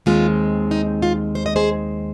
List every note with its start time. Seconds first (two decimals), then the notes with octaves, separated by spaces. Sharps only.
0.06 D#2 D#3 G#3 C4 F4
0.71 D#4
1.02 F4
1.35 C5
1.46 D#5
1.56 G#4 C5